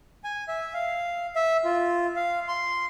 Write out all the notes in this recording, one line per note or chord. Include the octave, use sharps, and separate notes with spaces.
G#5
E5
F5
E5
F4
F5
C6